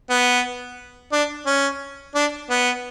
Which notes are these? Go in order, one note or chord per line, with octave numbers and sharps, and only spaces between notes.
B3
D4
C#4
D4
B3